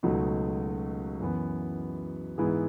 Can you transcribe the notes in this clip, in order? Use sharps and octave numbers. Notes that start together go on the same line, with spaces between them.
C#2 B2 F#3 A3 D#4
F#2 E3 B3
G#2 E3 B3 E4 G#4